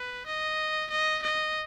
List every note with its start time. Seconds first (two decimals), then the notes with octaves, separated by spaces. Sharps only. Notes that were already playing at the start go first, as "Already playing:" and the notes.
Already playing: B4
0.26 D#5
0.90 D#5
1.23 D#5